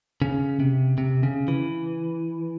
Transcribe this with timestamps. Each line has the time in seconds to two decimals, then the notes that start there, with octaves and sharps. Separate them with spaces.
0.22 C#3
0.60 C3
0.98 C3
1.23 C#3
1.48 E3